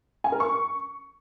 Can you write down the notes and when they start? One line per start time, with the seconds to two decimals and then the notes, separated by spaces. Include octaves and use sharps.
0.24 G#5
0.32 A#4
0.40 C#6